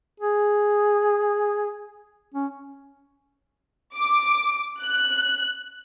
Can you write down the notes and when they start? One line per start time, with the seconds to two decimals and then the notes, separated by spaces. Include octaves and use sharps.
0.20 G#4
2.34 C#4
3.97 D6
4.83 F#6